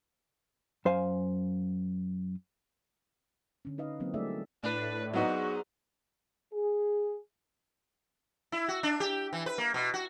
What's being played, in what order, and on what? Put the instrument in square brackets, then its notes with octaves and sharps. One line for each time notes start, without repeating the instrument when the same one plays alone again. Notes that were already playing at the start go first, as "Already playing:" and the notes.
[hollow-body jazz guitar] F#2 C5 F5 G#5
[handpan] D3 C#4
D#4 B4 D#5 F5
E3 F#3 A#3 C4
G3 A3 D4 G#4 D5 E5
[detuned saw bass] A2 [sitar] D4 [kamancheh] B4
[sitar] G#2 [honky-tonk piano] F#3 B3 D#4 [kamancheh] F#4
[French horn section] G#4
[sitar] E4
F#4
D4
G4
E3
B4
A#3
B2
F#4